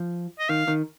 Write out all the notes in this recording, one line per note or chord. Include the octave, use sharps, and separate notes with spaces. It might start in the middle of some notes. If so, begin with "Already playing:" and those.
Already playing: F3
D#5
D#3 F5
D#3